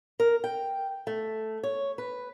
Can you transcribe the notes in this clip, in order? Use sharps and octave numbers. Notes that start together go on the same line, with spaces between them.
A#4
G5
A3
C#5
B4